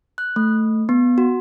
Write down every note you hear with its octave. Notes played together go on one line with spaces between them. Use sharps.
F#6
A3
B3
F#4